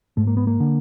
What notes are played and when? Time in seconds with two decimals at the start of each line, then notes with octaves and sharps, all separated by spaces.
0.17 G#2 A3
0.27 A#3
0.37 B3
0.47 A#3
0.60 D3